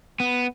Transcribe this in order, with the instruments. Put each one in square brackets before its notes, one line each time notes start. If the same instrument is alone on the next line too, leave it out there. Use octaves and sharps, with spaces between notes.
[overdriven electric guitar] B3